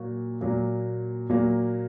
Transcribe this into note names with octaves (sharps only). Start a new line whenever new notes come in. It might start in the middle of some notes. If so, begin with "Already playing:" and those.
Already playing: A#2 F#3 A#3 F#4
A#2 F#3 A#3
A#2 F#3 A#3